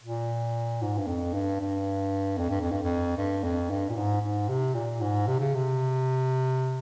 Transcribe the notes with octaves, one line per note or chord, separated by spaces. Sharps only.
A#2
G#2
G2
F2
G2
G2
F2
G2
F2
G2
F2
G2
F2
G2
A#2
G#2
G#2
C3
A#2
G#2
C3
C#3
C3